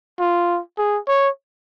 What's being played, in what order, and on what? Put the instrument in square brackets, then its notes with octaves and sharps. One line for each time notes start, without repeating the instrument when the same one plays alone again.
[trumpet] F4
G#4
C#5